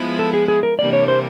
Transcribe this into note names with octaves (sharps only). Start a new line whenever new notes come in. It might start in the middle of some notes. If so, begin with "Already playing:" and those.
Already playing: F3 G#3 B3 E4
A4
G#4
G#4
A#4
C3 E3 G3 A#3 D4 D5
C#5
C5